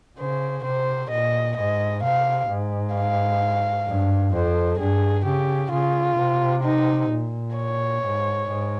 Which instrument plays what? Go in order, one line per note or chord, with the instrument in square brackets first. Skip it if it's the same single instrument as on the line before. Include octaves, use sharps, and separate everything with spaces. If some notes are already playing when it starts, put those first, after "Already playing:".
[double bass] C#3 [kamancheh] C5
[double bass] C3 [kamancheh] C5
[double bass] A#2 [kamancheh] D#5
[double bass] G#2 [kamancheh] D#5
[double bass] C3 [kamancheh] F5
[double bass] G#2
[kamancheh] F5
[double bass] G2
[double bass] F2 [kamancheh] C5
[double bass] G2 [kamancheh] G#4
[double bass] C#3 [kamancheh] G4
[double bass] C#3 [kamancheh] F4
[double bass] C3
[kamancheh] D#4
[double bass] A#2
[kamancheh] C#5
[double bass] G#2
G#2